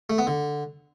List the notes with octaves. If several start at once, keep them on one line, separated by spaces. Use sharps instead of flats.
A3
B3
D3